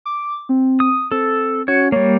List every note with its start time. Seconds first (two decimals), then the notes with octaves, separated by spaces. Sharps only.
0.06 D6
0.49 C4
0.80 D#6
1.11 C4 A4
1.68 C#4 F#4 C#5
1.92 G3 A#3 C#5